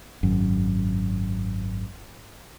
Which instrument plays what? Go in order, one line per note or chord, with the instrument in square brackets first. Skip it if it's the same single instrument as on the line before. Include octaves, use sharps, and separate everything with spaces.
[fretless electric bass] G#1 F#2